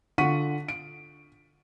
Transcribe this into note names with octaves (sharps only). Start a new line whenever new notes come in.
D3 F4 F#5 C#6 B6 D#7
D7